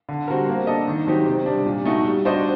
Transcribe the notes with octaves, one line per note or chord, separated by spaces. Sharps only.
D3
G3 C4 F#4 A#4
A#3
D4 A4 D#5
D#3
F#3 C4 D#4 G4
C3
G3 D4
A#2
A3 D#4 F#4
G3
D4 F#4 C5 D#5